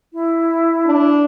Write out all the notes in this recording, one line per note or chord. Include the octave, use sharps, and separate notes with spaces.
E4
D4